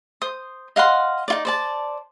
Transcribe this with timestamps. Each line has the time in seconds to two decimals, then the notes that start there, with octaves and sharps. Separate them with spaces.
0.22 C5 D#6
0.76 D#5 F5 F#5 C6
1.28 D#4 F4 D5
1.45 C5 D5 A5